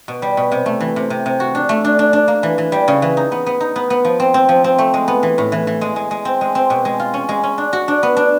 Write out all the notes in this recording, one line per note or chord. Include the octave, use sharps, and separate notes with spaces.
B2
G3
B2
C3
A3
E3
C3
C3
C3
F#4
D4
A3
D4
D4
D4
A#3
E3
E3
G3
C#3
E3
D#4
B3
B3
D#4
B3
B3
F3
C4
C4
F3
C4
A3
G#3
B3
E3
A2
E3
E3
G#3
G#3
G#3
C4
G#3
C4
B2
G#3
F4
C#4
G#3
C#4
D4
F#4
D4
B3
D4